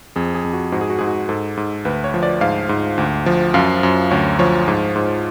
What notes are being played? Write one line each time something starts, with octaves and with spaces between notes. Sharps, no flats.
F2 G#4
G#4
F2
F#4
G#2 F#4
G#4
F#4
G#2 G#4
F#4
G#2 A4
G#2
D2 B4
C#5
F3
D5
G#2 F5
G#2
D2
F3
F#2 F5
F#2
D2 C#5
F3 C#5
G#2
G#2